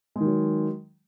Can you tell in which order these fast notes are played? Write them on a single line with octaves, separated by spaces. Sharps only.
G#3 D#3 F#3